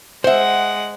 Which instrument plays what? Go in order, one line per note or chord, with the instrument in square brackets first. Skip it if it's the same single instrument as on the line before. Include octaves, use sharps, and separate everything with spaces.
[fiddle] G#3 F#5 [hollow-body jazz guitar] C5 E5